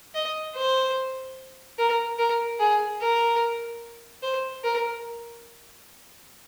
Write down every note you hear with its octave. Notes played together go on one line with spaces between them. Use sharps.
D#5
C5
A#4
A#4
G#4
A#4
C5
A#4